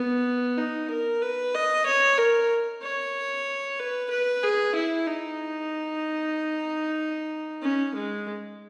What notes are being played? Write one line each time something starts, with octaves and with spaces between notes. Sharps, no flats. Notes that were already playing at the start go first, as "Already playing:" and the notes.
Already playing: B3
D#4
A#4
B4
D#5
C#5
A#4
C#5
B4
B4
G#4
E4
D#4
C#4
G#3